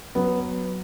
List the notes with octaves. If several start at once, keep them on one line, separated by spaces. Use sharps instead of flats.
F#3 B3